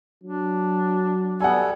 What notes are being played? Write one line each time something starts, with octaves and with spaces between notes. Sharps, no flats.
F#3 D4
G3 B3 A4 F#5 G#5